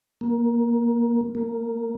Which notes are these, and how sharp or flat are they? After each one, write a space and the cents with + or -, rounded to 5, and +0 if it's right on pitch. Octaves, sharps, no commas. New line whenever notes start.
A#3 +15
A#3 -15